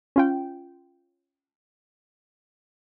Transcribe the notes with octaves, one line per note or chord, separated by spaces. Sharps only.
C#4 F4 G5